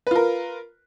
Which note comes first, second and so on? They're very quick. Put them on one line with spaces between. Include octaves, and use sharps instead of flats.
B4 F4 A#4